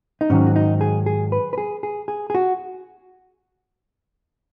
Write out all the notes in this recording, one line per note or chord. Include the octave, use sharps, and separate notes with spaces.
D#4
G#2 D#3 F#3 C#4
F#4
D#4
G#4
G#4
B4
B4
G#4
G#4
G#4
G#4
F#4